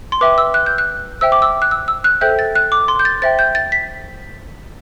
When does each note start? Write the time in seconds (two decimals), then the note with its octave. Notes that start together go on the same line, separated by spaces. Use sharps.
0.12 C6
0.21 B4 E5 G5 D6
0.38 E6
0.54 F#6
0.66 G6
0.78 F#6
1.21 C5 E5 G5 E6
1.32 D6
1.42 E6
1.62 F#6
1.71 E6
1.88 E6
2.04 F#6
2.21 A4 C5 E5 G5 G6
2.39 A6
2.55 F#6
2.72 D6
2.88 C6
2.99 G6
3.05 A6
3.22 C5 E5 G5 A6
3.39 G6
3.55 A6
3.72 B6